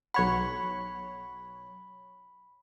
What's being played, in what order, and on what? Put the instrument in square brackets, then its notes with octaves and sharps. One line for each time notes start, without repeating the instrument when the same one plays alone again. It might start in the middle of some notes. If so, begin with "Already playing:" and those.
[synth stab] B1 C#5 F#5 [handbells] B5